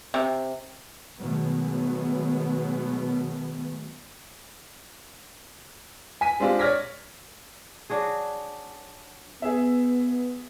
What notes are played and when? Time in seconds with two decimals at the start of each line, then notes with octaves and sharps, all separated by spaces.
0.14 C3
1.20 B2 D#3 F#3 G#3 A3 B3
6.21 G#5 B6 D#7
6.40 G#3 C4 D4 F4 G4
6.59 C#5 D5 F6 G#6 A#6 B6
7.90 F#3 D4 F#4 G#4
9.42 B3 G#4 E5